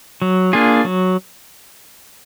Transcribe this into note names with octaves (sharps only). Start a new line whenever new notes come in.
F#3
A#3 D4 F4 G#4
F#3